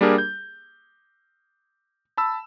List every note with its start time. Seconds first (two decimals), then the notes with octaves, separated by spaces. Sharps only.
0.01 G3 A#3 D4 G4 G#4 A#4
0.18 G6
2.17 A5 B5 E6